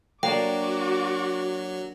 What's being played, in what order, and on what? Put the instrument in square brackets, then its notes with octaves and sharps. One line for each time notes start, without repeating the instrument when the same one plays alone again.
[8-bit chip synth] F#3 [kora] A#3 D4 [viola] F#4 D6 [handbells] G5